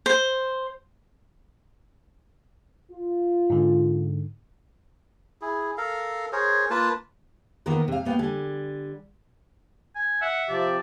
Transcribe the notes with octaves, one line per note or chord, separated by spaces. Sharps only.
C5
F4
G#2 D3
E4 G#4
A4 A#4 F5
G#4 A#4 C5 C#5
A#3 F4 B4 A5
D#3 A#3 B3 F4 A#4 B4
C3 F5
A#3 B3 F5 G5
D3 G3 G#5
G#5
E5 F#5
C3 F3 G4 D5